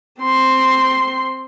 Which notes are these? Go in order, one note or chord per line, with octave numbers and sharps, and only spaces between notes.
C4 C6